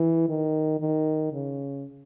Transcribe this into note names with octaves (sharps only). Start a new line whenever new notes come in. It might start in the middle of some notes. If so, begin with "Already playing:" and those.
Already playing: E3
D#3
D#3
C#3